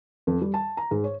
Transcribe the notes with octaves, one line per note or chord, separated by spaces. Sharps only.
F2
G3
A5
A#5
G#2
C#5